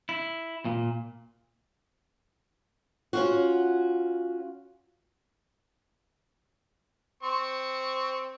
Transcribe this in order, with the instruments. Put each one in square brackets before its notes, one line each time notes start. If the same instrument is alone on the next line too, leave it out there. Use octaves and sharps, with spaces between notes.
[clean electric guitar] E4
A#2
[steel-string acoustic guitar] C#4 F4 F#4
[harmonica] C4 C#6